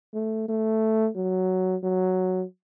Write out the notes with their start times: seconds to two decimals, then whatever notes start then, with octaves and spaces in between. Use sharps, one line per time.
0.14 A3
0.48 A3
1.16 F#3
1.83 F#3